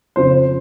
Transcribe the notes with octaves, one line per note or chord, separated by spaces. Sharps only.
F2 C#3 F3 C5